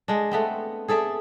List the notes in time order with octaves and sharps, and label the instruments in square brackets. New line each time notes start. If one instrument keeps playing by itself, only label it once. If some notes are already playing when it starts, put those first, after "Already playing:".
[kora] G#3 D4
A3 B3 C4
G#4 A4 D5 E5